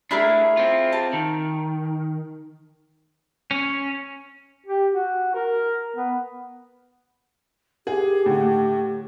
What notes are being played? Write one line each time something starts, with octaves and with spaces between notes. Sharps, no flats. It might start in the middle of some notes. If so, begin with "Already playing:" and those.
A3 D4 E4 G#4 A#4
C4 F4
A5
D#3
C#4
G4
F#4
A#4
B3
G4 G#4
A2 D3